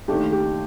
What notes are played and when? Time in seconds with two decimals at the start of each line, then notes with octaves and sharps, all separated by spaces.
0.08 D#2 D#3 A3 D4 G4
0.32 G4